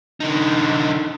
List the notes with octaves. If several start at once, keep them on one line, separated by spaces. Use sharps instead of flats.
D3 D#4